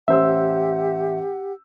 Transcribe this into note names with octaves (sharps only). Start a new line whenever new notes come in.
A1 G4 C5 E5 F#5 E6